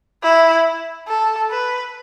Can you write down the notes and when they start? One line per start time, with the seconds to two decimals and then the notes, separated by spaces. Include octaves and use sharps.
0.23 E4
1.08 A4
1.50 B4